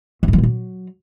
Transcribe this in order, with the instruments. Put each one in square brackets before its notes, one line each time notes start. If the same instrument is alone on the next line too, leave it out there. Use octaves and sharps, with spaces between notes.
[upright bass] F#2
A2
F3
A#2
F#3